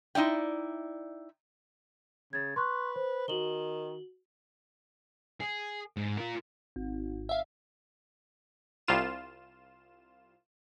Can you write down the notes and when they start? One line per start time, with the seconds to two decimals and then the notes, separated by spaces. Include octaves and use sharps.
0.15 D#4 E4 D5 G5
2.33 C#3 G#6 A6
2.56 B4 C6 C#6 F#6
2.96 C5
3.28 D#3 F#4 F#7 G7
5.40 G#4
5.97 G#2
6.18 F4 A#4
6.76 G#1
7.29 E5 F5
8.88 C2 F4 E7